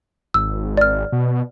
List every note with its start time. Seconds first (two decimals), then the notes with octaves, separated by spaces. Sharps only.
0.34 G#1 E6
0.77 D5 F6
1.12 B2